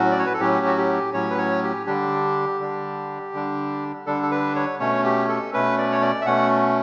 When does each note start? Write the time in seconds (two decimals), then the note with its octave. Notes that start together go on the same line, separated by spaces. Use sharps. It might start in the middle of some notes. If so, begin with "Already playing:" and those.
Already playing: A2 F#3 C#4 F#4
0.11 D5
0.19 C#5
0.26 B4
0.34 A4
0.40 A2 F#3 C#4 G4
0.66 F#4
0.77 G4
1.14 A2 F#3 C#4 C#5
1.30 B4
1.38 C#5
1.63 G4
1.86 D3 G3 D4 G4
2.60 D3 G3 D4
3.34 D3 G3 D4
4.06 D3 G3 D4 A4
4.23 A4
4.31 B4
4.55 C#5
4.79 B2 A3 C#4 C#5
5.04 G4
5.28 A4
5.53 B2 A3 C#4 B4
5.78 D5
5.92 C#5
6.01 D5
6.21 E5
6.26 B2 A3 C#4 F#5